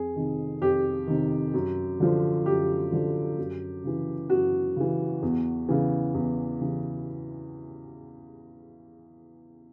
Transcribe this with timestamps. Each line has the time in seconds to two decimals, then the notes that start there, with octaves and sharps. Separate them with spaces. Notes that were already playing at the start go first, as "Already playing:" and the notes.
Already playing: F2 G#4
0.16 C3 D#3
0.61 F2 G4
1.07 C3 D#3
1.54 F#2
2.00 D3 F3
2.46 F#2 G4
2.92 D3 F3
3.38 F#2
3.84 C#3 E3
4.30 F#2 F#4
4.76 C#3 E3
5.22 E2
5.69 C#3 E3
6.14 E2
6.61 C#3 E3